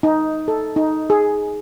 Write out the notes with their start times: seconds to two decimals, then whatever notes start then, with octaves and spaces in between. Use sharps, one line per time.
0.03 D#4
0.48 A4
0.76 D#4
1.10 G#4